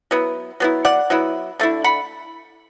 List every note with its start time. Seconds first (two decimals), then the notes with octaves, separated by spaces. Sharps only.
0.11 F#3 B3 E4
0.60 F#3 B3 E4
0.85 D5 F#5
1.10 F#3 B3 E4
1.59 D3 A3 E4
1.84 F#5 B5